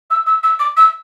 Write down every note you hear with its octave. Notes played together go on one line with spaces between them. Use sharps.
E6
E6
E6
D6
E6